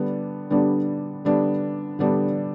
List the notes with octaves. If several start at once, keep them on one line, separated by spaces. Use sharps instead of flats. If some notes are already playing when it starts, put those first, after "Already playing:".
Already playing: D3 G3 B3 D4
D3 G3 B3 D4
D3 G3 B3 D4
D3 G3 B3 D4